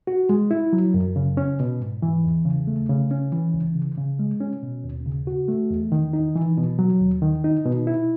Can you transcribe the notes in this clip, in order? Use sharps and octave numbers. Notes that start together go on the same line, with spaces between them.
F#4
G#3
E4
F#3
F#2
C#3
C#4
B2
G#2
E3
E2
C#3
A3
C#3
C#4
E3
C#2
C#3
C#3
G#3
C#4
B2
D#2
C#3
F#4
A3
E2
D#3
D#4
E3
B2
F#3
D#2
D#3
D#4
B2
E4